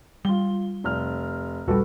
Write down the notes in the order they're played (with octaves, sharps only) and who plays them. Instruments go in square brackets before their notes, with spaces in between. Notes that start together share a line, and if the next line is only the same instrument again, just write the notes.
[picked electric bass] G3 [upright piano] F4 G7
[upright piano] F1 F6
[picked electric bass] D#1 A#1 G3 [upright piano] F#4 A4 B4